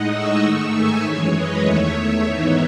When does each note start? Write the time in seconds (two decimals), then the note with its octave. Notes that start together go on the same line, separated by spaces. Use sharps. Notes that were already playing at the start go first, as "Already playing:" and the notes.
Already playing: A2 G#3 D#4 D#5 F#5
0.12 C#6 E6
0.43 G#2 D#3 A3 D#4 C#6 E6
0.74 E5 G#5
1.04 F#2 E3 G#3 C#5
1.34 B4 D#5
1.64 E2 D#3 A3 C#5 E5
2.25 G#2 E3 B3 D#4 C#5 E5